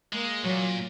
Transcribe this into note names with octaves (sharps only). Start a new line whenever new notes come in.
G#3 A#3
A#2 F#3